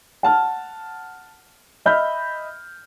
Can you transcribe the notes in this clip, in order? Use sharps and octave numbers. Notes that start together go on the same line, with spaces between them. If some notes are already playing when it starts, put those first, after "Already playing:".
F#5 A5 F6
D#5 E5 B5 F6 G6